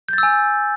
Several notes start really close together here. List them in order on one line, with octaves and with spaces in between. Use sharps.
G6 A6 E6 G#5